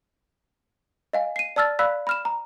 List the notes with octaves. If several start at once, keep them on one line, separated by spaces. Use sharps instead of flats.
D#5 F5 G#5
C7 D#7
D5 A5 E6 F6 A6
D5 F5 B5 E6 F#6 B6
B5 F6 E7
A#5